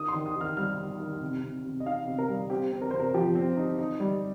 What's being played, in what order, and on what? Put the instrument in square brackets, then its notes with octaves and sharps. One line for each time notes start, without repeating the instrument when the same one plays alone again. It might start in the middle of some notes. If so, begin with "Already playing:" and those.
Already playing: [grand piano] D#3 D#6
C6
D#3
D#6
D#3 F6
G3 F6
D#3
D#3
C3
C3
C3
D#5
D#4 F5
C3
A#4
G3
C4 G4
C4
A#4
C3 C5
A#4
F3 G4
C4
D#4
D#4
G3